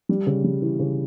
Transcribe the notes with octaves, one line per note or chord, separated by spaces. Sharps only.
G3
C#3
G3
E3
C#3